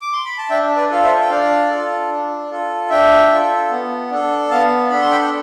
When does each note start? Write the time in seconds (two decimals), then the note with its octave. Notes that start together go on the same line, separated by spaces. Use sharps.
0.02 D6
0.13 C6
0.25 B5
0.38 A5
0.50 D4 E5 G5
0.76 B4 D5
0.90 F4 A4 F5
1.03 C5 E5
1.21 G5
1.30 D4 D5 F5
1.70 F4 A4
2.09 D4
2.50 F4 A4
2.90 D4 E5 G5
3.30 F4 A4
3.70 B3
4.10 D4 A4
4.50 B3 F5 A5
4.90 D4 A4 B5
5.01 C6
5.11 G5 B5